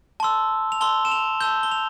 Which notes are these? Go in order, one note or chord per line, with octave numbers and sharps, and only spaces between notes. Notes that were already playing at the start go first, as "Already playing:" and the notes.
A5 C6 E6
F7
A5 C6 E6 G7
E7
F7
A5 E6 G6 G7
G7
F7